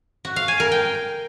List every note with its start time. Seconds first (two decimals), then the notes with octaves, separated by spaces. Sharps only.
0.25 F#4
0.36 F5
0.48 G#5
0.60 A#4
0.72 G5